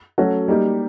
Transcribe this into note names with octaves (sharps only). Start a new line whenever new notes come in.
F#3 A3 C#4 F#4
G3 A#3 D#4 G4